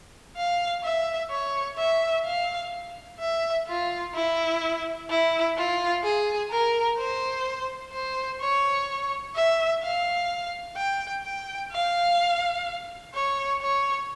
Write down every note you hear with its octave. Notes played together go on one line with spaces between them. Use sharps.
F5
E5
C#5
E5
F5
E5
F4
E4
E4
F4
G#4
A#4
C5
C5
C#5
E5
F5
G5
G5
F5
C#5
C#5